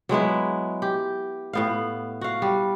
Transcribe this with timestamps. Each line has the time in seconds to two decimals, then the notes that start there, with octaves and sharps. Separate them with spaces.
0.09 F#3 G#3 B3 E4
0.82 G4
1.53 A2 B3 F5
2.21 F#4 F5
2.42 G3